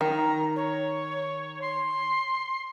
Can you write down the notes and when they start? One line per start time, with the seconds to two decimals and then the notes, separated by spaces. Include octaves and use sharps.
0.01 D#3 A#5
0.56 C#5
1.62 C6